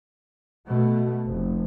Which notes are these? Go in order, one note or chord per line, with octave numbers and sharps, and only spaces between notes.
B2 A3
F1